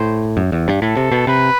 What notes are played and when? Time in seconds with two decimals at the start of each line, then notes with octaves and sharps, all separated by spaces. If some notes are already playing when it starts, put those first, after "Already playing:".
Already playing: A2 C5
0.37 F#2
0.52 E2
0.68 G2
0.82 A2 A4
0.97 C3
1.12 B2
1.27 C3 B4